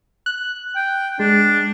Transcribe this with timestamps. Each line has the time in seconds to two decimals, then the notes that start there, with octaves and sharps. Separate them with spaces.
0.26 F#6
0.76 G5
1.19 G#3 D4